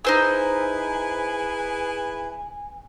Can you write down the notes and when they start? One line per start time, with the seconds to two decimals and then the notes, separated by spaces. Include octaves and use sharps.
0.05 D#4 E4 G#4 B4 C5 G#5 E6